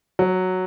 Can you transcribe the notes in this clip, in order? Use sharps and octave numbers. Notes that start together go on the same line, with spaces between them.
F#3